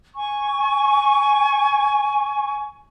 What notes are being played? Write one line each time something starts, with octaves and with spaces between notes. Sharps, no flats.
G#5 C#6